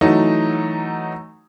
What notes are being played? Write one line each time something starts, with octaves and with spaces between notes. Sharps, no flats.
E3 F#3 A3 D#4